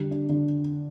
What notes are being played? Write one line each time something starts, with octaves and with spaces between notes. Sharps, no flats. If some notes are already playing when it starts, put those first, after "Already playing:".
Already playing: D3 G3
D4
D3